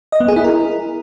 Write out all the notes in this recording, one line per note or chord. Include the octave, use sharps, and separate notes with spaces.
D#5
B3
G#4
E4
A#4